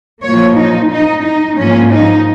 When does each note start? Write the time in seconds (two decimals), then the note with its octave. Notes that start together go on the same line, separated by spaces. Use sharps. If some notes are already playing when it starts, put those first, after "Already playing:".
0.23 A#2 F3 A#3 C#5
0.56 D#4
0.90 D#4
1.24 D#4
1.57 G#2 F3 A#3 C#4
1.92 D#4